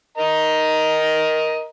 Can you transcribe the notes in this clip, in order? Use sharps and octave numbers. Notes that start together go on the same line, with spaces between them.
A#4 D#5 A#5